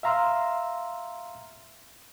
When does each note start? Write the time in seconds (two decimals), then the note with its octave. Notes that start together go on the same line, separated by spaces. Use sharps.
0.03 E5 F5 A#5 C6 E6 F6